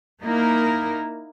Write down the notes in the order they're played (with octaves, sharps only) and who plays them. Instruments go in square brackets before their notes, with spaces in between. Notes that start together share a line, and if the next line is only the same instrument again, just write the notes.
[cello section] A#3 D#4 E4 A#4